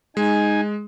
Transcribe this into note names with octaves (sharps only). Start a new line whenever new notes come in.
G#3 D#4 G#5